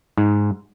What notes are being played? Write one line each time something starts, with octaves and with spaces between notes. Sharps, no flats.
G#2